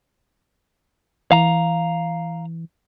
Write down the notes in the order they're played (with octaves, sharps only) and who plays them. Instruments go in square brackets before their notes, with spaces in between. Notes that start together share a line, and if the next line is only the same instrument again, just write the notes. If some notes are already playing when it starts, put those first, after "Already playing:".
[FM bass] E3 [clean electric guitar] F5 A#5